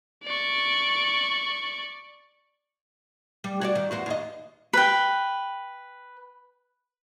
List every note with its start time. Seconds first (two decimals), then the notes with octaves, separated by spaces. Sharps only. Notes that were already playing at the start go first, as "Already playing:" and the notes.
0.24 D5 C#6
3.44 G3
3.61 F#4 C#5 D5
3.75 D#3
3.91 E2 F#4 C5
4.06 D#2 D#5
4.73 B4 G5